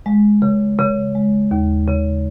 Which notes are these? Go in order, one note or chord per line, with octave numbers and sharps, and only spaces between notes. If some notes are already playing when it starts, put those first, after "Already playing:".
G#3
C#3
C#3
G#3
D#2
C#3